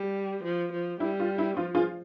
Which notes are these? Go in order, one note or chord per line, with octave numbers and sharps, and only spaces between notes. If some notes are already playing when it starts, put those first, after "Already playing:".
Already playing: G3
F3
F3
G3 E4
F4
E4
F3 F4
F4 G#4